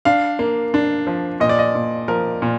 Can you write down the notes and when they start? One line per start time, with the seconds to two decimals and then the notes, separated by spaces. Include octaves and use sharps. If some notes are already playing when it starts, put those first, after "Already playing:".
0.05 D4 F5
0.39 A#3
0.74 D4
1.07 F3
1.40 A#2 D#5
1.49 D5
1.59 D#5
1.75 A#2
2.08 F3 A#4
2.42 A#2